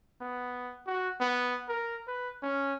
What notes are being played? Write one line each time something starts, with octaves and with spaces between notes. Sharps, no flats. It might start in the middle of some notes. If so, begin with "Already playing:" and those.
B3
F#4
B3
A#4
B4
C#4